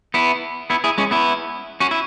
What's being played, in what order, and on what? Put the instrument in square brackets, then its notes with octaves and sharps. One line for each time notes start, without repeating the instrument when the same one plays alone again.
[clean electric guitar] B3 E4
B3 E4
E4 G#4
G#3 C#4
B3 E4
C#4 F#4
E4